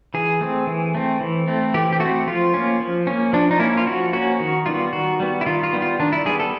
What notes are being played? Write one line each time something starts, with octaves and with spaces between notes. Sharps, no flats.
E3 G#4
A3 C4
E3
A3 C4
E3
A3 C4
E3 G4
G4
A3 F#4
C4
F3 F4
A#3 C#4
F3
A#3 C#4
F3 D4
D#4
A#3 C#4 E4
F4
F3 F#4
A#3 C#4 F#4
D#3 F#4
G3 B3 F4
D#3 F#4
G3 B3
E4
D#3 F4
F4
G3 B3
F4
D#3 D4
E4
G3 B3 G#4
A4